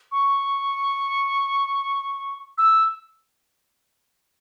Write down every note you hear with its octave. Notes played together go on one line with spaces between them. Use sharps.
C#6
E6